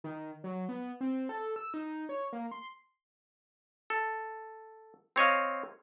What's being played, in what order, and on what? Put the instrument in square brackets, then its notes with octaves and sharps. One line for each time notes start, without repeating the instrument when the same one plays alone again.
[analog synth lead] D#3
F#3
B3
C4
A4
E6
D#4
C#5
A#3
C6
[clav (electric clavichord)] A4
C4 C#5 D#5 F5